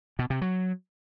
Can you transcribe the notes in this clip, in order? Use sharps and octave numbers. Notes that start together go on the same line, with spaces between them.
B2
C3
F#3